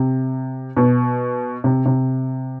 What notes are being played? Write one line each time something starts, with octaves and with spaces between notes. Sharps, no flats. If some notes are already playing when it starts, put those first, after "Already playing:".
Already playing: C3
B2
C3
C3